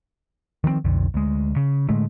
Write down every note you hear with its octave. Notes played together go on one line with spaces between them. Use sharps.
D#3 F3 G3 C4
B1 F2 D3
D2 G#3
C#3
A2 D3 G#3 A3